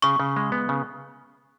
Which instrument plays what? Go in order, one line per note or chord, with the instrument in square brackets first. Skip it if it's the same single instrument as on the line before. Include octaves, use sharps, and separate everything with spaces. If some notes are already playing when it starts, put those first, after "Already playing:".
[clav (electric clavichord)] C#3 [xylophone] C#6
[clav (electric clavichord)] C#3
G#3
B3
C#3